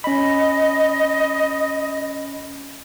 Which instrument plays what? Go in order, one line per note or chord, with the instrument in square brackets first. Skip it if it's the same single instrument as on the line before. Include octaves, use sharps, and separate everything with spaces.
[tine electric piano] C#4 B5 [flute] D#5